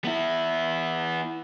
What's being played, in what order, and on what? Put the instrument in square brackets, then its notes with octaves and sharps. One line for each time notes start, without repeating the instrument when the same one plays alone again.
[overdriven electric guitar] B3 E4